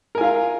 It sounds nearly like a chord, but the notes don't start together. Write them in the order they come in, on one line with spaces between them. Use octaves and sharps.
A#4 G#5 F4 F5